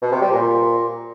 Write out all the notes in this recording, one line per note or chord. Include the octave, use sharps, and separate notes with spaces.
B2
C3
G3
A#2